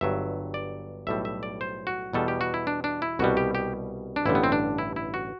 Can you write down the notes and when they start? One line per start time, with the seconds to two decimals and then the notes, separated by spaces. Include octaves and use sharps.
0.01 G1 G2 F#3 E5
0.54 D5
1.07 B1 A2 G3 E5
1.25 E5
1.43 D5
1.61 C5
1.87 F#4
2.13 E2 B2 G3 A4
2.28 G4
2.41 F#4
2.54 E4
2.67 D4
2.84 D4
3.02 E4
3.19 C2 B2 G3 F#4
3.37 G4
3.55 G4
4.16 D4
4.26 A1 G2 D3 G3 E4
4.35 B3
4.44 C4
4.52 D4
4.78 E4
4.96 E4
5.14 F#4